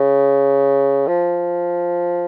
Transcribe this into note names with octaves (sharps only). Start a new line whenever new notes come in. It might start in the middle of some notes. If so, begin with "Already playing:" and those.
Already playing: C#3
F3